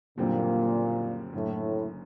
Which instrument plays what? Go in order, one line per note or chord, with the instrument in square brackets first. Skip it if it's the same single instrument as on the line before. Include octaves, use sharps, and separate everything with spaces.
[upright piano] F#1 F#2 D3 G3 C4 [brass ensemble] A#2
[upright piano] F#1 F#2 D3 [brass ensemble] A2